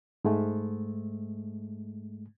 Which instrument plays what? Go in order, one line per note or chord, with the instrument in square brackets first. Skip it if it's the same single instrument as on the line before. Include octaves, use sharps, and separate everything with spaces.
[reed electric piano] G#2 G#3 A3